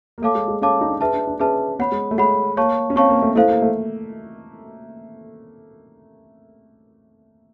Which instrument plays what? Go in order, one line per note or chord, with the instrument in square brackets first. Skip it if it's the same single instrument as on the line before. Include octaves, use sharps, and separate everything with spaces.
[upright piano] A#3
[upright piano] A3 [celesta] A4 C#5 F5 A5 D6
[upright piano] G#3
G#3
[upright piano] C#4 [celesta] A4 C#5 F5 A5 D6
[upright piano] D#4
D4
[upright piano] D4 [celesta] G#4 B4 E5 A5
[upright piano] D4
D4
[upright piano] C#4 [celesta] G#4 B4 E5 A5
[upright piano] B3 [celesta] C#5 F#5 B5
[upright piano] G#3
A3
[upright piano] G#3 [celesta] C#5 F#5 B5
[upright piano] A#3 [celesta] C#5 F5 A5 C#6
[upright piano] C#4
[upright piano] C4 [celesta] C#5 F5 A5 C#6
[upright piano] A#3
A3
[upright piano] A3 [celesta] E4 A4 C5 F5
[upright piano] A#3
A3